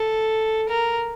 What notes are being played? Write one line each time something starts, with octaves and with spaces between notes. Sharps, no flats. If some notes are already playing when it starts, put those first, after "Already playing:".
Already playing: A4
A#4